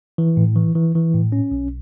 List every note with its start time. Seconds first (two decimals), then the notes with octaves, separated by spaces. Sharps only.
0.18 E3
0.37 A2
0.56 E3
0.76 E3
0.95 E3
1.14 A2
1.32 C#4
1.51 B1